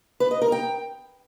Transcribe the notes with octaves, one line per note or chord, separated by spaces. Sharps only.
B4
D#5
A#4
G5